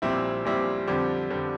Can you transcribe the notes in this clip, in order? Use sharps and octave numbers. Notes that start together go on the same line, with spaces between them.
A#1 A#2 G3 C4 E4
A#1 A#2 G3 C4 E4
F2 D3 G3
F2 D3 G3